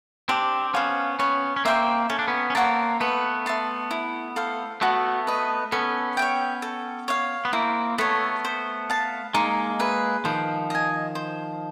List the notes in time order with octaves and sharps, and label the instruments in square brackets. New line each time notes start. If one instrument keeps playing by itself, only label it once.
[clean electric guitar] C4 D4 [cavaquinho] G4
[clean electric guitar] B3 C#4 [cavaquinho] C5 F5
[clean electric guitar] B3 C#4 [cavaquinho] C#5
[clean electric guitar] C#4
[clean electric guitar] A#3 C4 [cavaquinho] E5 G5 C6
[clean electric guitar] C#4 [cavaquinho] A4
[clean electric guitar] D4
B3 C#4
C#4
[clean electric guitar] A#3 C4 [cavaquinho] C#5 F#5 A5
[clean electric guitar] A3 B3 [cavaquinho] B4
[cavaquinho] E5 A5 C6
E4
A4 C5 F5
[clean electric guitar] A3 B3 [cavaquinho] F#4
[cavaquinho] B4 D#5
[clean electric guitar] B3 C#4 [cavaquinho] A4
[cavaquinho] C#5 E5 G5
A4
C#5 F5
[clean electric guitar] B3
[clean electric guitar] A#3 C4 [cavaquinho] E4
[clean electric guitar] A3 B3 [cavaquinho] A4 C#5
[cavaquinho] C5
F5 A5
[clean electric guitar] G#3 A#3 [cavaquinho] D#4
[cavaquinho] G#4 B4 E5
[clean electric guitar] D#3 F3 [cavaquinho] C5
[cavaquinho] D#5 G#5
C5